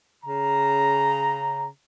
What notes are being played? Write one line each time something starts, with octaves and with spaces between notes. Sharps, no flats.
C#3 A#5